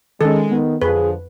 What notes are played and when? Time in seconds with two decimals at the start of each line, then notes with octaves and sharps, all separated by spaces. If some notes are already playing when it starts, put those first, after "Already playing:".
0.21 D#3 G#3 C#4 A4
0.51 D#3 B3
0.82 F2 D3 F3 G#4 B4